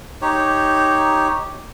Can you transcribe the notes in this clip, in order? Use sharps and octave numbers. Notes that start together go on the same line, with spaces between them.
D#4 G4 C#5